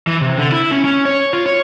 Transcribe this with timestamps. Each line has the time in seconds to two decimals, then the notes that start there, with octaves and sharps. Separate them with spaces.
0.07 E3
0.21 C3
0.38 D3
0.52 E4
0.71 C#4
0.84 C#4
1.05 C#5
1.33 F4
1.46 C#5